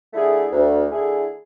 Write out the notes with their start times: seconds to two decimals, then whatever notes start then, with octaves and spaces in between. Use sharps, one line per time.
0.13 D3 A3 E4 G#4
0.51 D2
0.91 D3 A3 E4 G#4